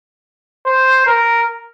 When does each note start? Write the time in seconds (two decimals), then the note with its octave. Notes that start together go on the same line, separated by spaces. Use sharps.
0.66 C5
1.06 A#4